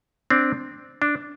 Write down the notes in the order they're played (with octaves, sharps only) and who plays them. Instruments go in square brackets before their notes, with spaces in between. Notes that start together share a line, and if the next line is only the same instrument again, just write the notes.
[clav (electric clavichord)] C4 D4
D4